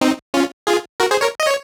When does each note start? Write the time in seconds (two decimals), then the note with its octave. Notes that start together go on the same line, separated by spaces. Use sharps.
0.01 C4 D#4
0.34 C#4 F4
0.67 F4 G#4
1.00 F#4 A#4
1.11 G#4 C5
1.21 A#4 C#5
1.40 D#5
1.47 C#5